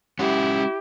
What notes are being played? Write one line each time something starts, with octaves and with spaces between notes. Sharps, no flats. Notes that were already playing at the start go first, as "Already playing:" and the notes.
G#3 C#4 E4 G4 F#5